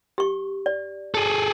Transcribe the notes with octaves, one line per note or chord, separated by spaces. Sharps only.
G4 C#6
D5
G#4 A4